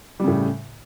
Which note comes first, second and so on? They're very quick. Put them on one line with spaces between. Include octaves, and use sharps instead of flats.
G3 C#3 A2